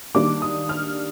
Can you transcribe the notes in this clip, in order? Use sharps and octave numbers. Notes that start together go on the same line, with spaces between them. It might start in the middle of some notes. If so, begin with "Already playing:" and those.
D#3 G3 A#3 D4 D6
D#6
F6